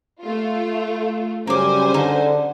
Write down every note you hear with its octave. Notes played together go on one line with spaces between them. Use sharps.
A3 F4
F#2 C#3 G3 C#4 A#4 C5 G#5 D6
D3 D#4